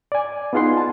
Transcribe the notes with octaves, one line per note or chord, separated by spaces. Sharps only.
D5 G#5
B3 D#4 F4 G#4 F#5 C6
A5